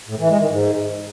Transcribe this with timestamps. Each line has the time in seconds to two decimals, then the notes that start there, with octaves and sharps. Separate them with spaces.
0.08 A2
0.19 E3
0.29 G#3
0.39 D#3
0.50 G#2